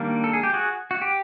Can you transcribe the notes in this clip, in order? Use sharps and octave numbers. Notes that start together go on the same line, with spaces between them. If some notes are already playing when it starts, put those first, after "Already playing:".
Already playing: D#3 G3 A#3 D4
A4
G#4
G4
F#4 G#4
F#4
G4